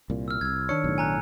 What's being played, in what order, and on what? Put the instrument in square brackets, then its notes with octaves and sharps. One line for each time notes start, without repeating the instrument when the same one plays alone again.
[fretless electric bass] C2 A#2
[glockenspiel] E6 F6
[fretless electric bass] C2 [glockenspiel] E6 G#6
[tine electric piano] D#3 D4 C#5 [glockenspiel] C#7
[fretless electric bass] B1 A2
[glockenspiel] G#5 A#5 F#6